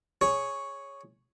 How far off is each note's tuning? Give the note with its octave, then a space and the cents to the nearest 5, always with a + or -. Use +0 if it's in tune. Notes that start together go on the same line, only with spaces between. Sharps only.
G#4 +0 C#5 +0